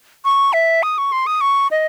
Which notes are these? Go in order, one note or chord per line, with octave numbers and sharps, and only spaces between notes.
C#6
E5
D#6
C#6
C6
D#6
C#6
D#5